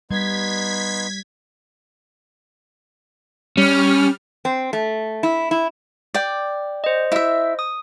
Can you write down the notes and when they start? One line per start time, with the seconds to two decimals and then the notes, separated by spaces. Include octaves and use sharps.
0.11 G3 B3 D#4 C6 G#6 B6
3.57 G3 C#4 F6
4.45 C4
4.73 A3
5.23 E4
5.51 E4
6.14 D5 G5
6.84 C5 D#5
7.12 E4 E5
7.59 D#6